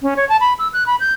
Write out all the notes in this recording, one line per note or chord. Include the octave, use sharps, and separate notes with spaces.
C#4
C#5
A5
B5
E6
F#6
B5
G6